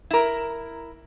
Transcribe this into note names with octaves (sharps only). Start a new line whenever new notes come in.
E4 A#4